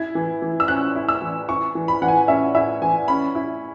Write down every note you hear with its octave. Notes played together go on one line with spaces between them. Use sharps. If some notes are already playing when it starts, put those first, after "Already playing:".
Already playing: E4 G#6
E3
E3
E6
C#4 F#6
E4
E6
E3
E4 C#6
E3
B5
E3 F#5
G#5
C#4 E5
E4 E5
E3 G#5
C#4 B5
E4